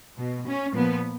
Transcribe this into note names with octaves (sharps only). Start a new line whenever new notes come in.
B2
C#4
A#2 F3 B3